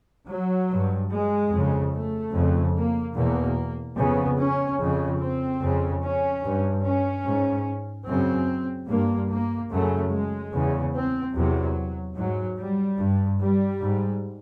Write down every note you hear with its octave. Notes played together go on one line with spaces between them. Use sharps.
F#3
G2
G#3
F2 C#3
A3
F2 C#3
A#3
E2 B2 A#3
F2 C#3 B3
C#4
F2 C#3
C4
F2 C#3
C#4
G2
C#4
G#2
F#2 C#3 C4
G2 A#3
A#3
F#2 C#3 A3
G#3
E2 C#3
C4
E2 C3 F#3
G#2 F#3
G3
G2
G3
G#2